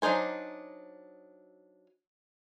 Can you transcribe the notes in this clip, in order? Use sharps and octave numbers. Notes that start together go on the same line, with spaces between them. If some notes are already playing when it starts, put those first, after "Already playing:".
F#3 D4 D#4 C5 G#5